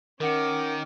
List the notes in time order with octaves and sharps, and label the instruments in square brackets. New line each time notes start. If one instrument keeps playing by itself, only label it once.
[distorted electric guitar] D#3 [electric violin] C#4 D6 [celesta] A#4 F#5 C#7